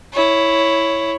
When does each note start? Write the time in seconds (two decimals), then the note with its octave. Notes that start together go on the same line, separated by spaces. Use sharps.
0.13 E4 C#5